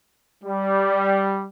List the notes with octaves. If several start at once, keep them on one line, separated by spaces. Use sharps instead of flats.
G3